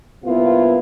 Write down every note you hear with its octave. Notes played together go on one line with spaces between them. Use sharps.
G2 C3 A#3 B3 E4 F4